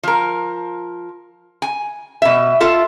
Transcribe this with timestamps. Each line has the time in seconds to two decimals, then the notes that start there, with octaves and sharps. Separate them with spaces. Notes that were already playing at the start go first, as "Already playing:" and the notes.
0.03 F3 A#4
1.62 G#5
2.22 B2 E5
2.60 F4 A4 E5